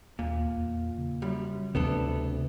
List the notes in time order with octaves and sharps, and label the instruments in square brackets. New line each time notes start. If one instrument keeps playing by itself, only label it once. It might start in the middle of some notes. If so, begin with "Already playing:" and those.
[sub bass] D#2 [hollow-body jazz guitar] A#2
[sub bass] E2
C#3
[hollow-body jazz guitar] F#2 G3
[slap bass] D2 C3 [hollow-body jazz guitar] B3 D4 A4